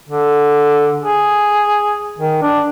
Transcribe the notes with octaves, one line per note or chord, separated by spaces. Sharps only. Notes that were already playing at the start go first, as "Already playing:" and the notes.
D3
G#4
D#3
D4